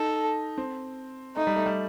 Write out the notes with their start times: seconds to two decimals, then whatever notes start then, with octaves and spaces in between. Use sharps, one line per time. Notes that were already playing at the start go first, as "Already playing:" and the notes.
Already playing: D#4 A4
0.58 C4
1.36 A3 D#4
1.47 G3
1.56 A3
1.66 G3